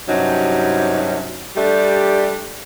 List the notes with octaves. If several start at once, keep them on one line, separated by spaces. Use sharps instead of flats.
G2 C3 F#3 C#4 D#4
G3 A3 D4 G4